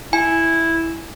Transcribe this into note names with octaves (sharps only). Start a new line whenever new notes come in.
E4 G#5